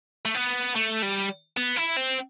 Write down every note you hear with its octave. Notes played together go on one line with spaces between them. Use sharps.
A3
B3
A3
G3
B3
E4
C4